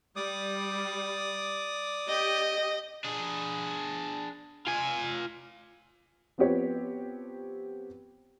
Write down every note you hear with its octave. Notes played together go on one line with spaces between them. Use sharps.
G3 D5 D6 D#6
G4 D#5
D4 G#4
F4 G#5
F3 B3 C4 G4 C#5